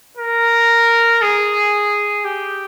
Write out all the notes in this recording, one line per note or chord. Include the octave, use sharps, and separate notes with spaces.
A#4
G#4
G4